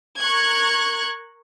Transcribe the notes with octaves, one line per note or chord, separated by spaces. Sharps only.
A#4 C#6 F#6 G#6